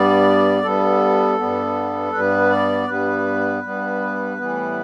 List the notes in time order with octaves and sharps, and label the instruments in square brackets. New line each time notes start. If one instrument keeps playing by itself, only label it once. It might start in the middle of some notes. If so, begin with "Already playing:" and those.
Already playing: [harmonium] G2 G3 B3 D5
G2 G3 B3 A4
G2 G3 B3
G2 G3 B3 B4
D5
G2 G3 B3 B4
G2 G3 B3
A2 E3 G3 B3